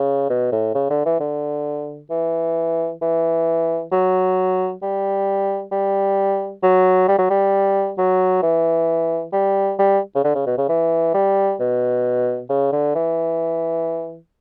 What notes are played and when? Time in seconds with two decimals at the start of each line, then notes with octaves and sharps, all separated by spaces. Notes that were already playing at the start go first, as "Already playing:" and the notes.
Already playing: C#3
0.30 B2
0.52 A2
0.75 C#3
0.90 D3
1.06 E3
1.20 D3
2.10 E3
3.02 E3
3.92 F#3
4.82 G3
5.71 G3
6.63 F#3
7.08 G3
7.18 F#3
7.30 G3
7.98 F#3
8.42 E3
9.33 G3
9.79 G3
10.15 C#3
10.24 D3
10.35 C#3
10.46 B2
10.58 C#3
10.69 E3
11.14 G3
11.59 B2
12.50 C#3
12.72 D3
12.95 E3